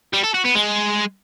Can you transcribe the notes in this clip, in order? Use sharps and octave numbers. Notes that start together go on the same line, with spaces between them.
G3
A4
F#4
B3
G#3